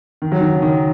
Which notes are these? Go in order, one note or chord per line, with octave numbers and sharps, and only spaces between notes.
D#3
F#3
D#3
C#3
D#3